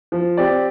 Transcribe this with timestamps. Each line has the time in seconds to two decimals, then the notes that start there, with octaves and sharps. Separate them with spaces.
0.12 F3
0.37 C4 G4 D5